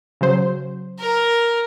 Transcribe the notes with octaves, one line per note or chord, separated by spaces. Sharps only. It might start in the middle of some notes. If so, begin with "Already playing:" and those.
C#3 F#3 C5
A#4